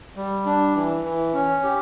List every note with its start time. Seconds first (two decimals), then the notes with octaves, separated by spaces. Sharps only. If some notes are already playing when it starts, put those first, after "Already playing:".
0.16 G3
0.46 D4
0.75 E3
1.04 E3
1.33 C#4
1.63 G4